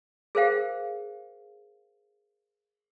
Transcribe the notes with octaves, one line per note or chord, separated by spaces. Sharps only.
G#4 A#4 C5 F5 G5